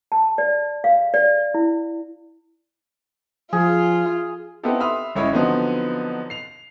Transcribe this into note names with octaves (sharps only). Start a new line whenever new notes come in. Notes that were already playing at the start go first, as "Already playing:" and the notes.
A5
D5
F5
D5
E4
F3 F4 G#4
B3 C4 D#4 E4 G4 A4
E5 B5 C6 D#6 F6
G#1 C#4 E4 C#5 D#5 B5
D3 F3 F#3 B3 C4 D#4
C7 F7